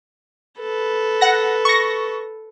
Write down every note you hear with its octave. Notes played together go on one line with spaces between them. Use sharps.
A4 B4
F#5 A#6
C#6 A#6